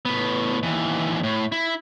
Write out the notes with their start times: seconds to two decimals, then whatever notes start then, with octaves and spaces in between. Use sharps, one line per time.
0.05 A2 B3
0.63 D#2 E3
1.23 A2
1.52 E4